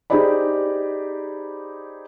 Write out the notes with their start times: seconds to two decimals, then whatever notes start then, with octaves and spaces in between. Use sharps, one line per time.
0.10 D#4 G4 G#4 C5 D5 B5